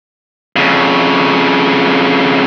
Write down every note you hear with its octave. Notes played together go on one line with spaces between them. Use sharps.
F2 C#3